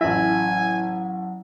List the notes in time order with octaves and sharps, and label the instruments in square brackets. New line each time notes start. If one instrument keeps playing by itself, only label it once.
[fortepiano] A1 E5 [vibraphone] F#3 F#5 [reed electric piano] E4 [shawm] G#5